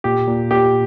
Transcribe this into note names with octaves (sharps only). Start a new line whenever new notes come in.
A#2 G4
A#2
A#2 G4